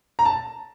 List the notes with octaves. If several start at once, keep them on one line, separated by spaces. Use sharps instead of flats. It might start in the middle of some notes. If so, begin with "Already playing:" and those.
A#5
A5